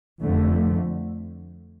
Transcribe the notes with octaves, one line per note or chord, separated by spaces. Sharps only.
F2 D3 A3